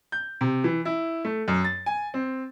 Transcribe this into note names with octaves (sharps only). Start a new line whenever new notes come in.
G6
C3
E3
E4
A3
F#2
A6
G#5
C4